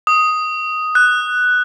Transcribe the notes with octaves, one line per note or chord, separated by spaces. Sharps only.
D#6
F#6